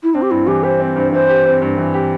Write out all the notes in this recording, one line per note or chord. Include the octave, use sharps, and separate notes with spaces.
E4
C4 D4
G4
G2 E4
E3 G4
G4 C5
C4
G2
E3 C5
G4
C4
G2
E3
G4